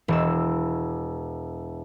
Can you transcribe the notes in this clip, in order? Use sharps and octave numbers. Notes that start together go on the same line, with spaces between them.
E1 E6